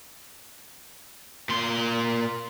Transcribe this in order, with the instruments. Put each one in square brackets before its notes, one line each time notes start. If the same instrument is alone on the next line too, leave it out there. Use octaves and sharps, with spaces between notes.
[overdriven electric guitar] A#2 C6